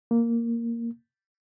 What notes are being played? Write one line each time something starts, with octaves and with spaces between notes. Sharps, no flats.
A#3